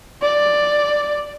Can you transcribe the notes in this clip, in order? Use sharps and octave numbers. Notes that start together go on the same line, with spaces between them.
D5